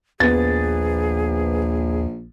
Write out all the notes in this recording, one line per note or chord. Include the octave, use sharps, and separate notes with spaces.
A#1 D#2 B3 G#4 A6